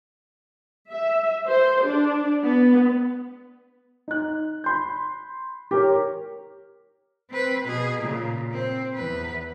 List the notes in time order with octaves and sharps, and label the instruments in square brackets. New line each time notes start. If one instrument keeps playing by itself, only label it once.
[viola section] E5
C5
D4
B3
[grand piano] D#4 F#6
B5 C6 G6
G4 A#4 C#5
[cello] C4 B4
B2 G#4
A#2 C#3
C4
E2 B4